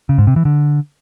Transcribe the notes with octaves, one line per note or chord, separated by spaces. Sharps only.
C#3
G#2
C3
E3
D3